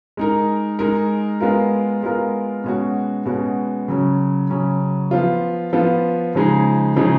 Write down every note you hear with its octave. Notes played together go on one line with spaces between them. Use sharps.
G#3 D#4 A#4
G#3 D#4 A#4
G#3 B3 F4 A#4
G#3 B3 F4 A#4
B2 G#3 C#4 F#4
B2 G#3 C#4 F#4
C#3 F#3 C#4
C#3 F#3 C#4
F3 B3 F4
F3 B3 F4
C#3 F3 G#3 D#4 G#4
C#3 F3 G#3 D#4 G#4